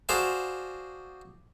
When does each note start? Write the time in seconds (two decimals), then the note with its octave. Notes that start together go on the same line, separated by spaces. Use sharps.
0.09 F#4 G#4 C5 D5 F5 A5